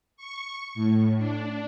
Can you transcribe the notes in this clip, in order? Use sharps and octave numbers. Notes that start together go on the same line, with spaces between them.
C#6
A2
D4